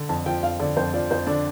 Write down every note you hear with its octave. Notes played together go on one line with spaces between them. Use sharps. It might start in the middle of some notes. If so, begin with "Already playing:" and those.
Already playing: D3
F2 A5
F3 G5
F2 F5
D3 D5
F2 C5
F3 D5
F2 C5
D3 D4